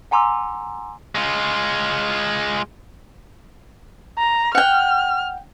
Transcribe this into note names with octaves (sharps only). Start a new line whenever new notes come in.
F#5 G#5 A#5 C6 D6 E6
G#3 F4
A#5
F#5 G5 F6